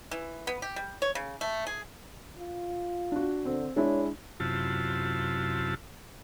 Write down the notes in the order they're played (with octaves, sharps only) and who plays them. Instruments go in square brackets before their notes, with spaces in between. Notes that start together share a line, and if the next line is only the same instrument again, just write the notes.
[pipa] E3
B3
G4
G3
C#5
C#3
A3
G#4
[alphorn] F4
[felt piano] D4 F#4
[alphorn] D3 [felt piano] C4
[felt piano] G#3 D4 E4 [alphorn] C#5
[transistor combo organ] F#2 C3 E4 F4 A5